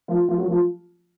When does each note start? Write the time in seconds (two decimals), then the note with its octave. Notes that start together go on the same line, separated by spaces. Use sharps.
0.08 F3 F4
0.28 F3 F4
0.38 F#3 F#4
0.48 F3 F4